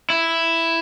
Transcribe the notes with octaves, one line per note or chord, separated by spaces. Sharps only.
E4